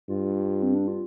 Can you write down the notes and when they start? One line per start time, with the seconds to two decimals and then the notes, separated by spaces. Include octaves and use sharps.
0.09 G2 F4
0.62 C4
0.74 D4
0.88 F4